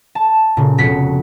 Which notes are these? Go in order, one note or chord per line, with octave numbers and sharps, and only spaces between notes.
A5
A#2 C#3
F1 B3 F#4 B6 C#7